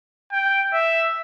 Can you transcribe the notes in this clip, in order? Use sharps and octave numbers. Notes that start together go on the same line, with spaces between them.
G5
E5